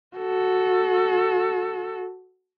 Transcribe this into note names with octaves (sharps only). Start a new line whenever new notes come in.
F#4 A4